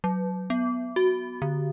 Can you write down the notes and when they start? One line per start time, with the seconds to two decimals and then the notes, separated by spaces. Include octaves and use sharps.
0.04 F#3
0.50 B3
0.96 F#4
1.42 D3